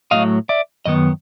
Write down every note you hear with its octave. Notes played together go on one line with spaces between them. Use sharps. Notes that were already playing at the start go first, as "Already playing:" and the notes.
A2 F#3 A3 D#5 F5
D5 E5
F#2 D#3 B3 D#5